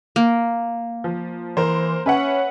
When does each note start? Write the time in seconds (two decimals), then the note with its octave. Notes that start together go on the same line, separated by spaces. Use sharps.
0.16 A#3
1.04 F3
1.57 E3 A#4 C5
2.06 C#4 B4 E5 F#5